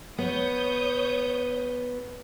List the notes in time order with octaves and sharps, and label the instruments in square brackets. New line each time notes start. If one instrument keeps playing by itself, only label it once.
[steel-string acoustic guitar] B3 [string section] C#5 D#6 G6